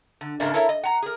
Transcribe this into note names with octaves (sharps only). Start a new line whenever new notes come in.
D3
G#2 C#3 F#3 A3 A#3 D4
E4 A4 A#4 C#5 E5
D#5
F#5 A#5
G#4 A#4